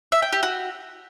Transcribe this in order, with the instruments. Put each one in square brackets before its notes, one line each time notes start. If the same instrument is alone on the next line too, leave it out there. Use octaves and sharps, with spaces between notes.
[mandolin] E5
G5
G4
F#4